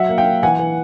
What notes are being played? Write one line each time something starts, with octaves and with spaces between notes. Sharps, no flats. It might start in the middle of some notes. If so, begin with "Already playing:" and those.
Already playing: F#3 E5 F#5
A#3
F5 G5
A#3
E3 F#5 G#5
E3